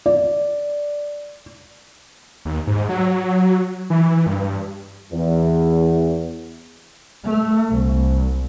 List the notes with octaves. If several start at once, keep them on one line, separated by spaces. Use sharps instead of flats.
D5
D#2
G#2
F#3
E3
G2
E2
A3
C2